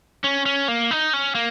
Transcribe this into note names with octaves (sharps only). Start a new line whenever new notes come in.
C#4
C#4
A#3
D#4
C#4
A#3